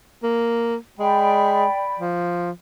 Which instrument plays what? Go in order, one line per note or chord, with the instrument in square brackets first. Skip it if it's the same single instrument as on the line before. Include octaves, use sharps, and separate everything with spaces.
[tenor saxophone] A#3
[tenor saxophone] G#3 [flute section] D5 G5 B5
[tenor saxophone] F3